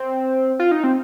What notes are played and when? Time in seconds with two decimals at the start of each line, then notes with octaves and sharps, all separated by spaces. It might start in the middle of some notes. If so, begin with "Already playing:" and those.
Already playing: C4
0.59 F4
0.71 D#4
0.84 C4